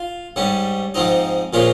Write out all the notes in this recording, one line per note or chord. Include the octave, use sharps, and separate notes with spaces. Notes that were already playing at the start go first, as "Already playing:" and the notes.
Already playing: F4
G#2 G3 C#4
G#2 F3 C4 D#4
A#2 F3 G#3 C#4 F4